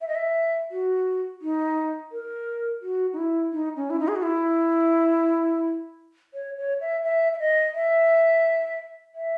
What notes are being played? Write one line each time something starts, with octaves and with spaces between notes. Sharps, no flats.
E5
D#5
E5
F#4
D#4
A#4
F#4
D#4
E4
D#4
C#4
E4
D#4
G#4
F#4
E4
C#5
C#5
E5
E5
E5
D#5
E5
E5